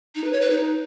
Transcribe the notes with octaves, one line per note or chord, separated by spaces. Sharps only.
D#4
B4
C#5
B4
D#4